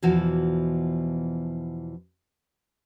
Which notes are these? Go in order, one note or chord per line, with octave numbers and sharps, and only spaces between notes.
E2 B2 E3 F3 F#4 A5